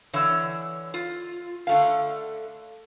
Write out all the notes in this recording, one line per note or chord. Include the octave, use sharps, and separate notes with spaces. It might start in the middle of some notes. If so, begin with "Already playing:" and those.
D3 E3 C#5 E5
F4
D3 A3 F5